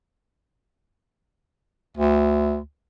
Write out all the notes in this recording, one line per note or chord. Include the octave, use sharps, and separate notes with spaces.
D2